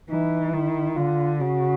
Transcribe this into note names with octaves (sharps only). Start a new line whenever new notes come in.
E3 D#4
D#3 E4
D3 F4
C#3 F#4